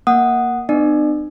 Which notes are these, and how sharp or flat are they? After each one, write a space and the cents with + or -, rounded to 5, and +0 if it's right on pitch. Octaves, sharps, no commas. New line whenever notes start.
A#3 +0 F#5 +0 D#6 -5
B3 +35 D4 +45 D5 +40